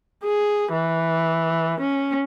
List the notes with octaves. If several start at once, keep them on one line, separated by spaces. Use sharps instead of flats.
G#4
E3
C#4